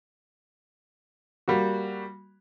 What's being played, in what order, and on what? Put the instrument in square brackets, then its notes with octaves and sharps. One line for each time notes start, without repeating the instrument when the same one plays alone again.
[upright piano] G3 A#3 F#4